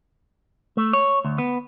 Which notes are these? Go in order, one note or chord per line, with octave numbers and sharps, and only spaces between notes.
A3
C#5
D2
B3